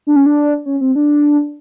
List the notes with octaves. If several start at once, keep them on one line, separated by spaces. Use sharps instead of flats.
D4
C#4
D4
C#4
C4
D4